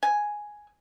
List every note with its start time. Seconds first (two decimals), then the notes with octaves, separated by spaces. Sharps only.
0.03 G#5